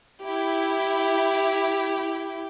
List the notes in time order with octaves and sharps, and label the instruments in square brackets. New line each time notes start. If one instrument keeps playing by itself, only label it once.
[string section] E4 [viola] G4